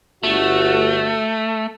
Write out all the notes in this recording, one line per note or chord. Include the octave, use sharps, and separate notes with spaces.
G1 A3 F#4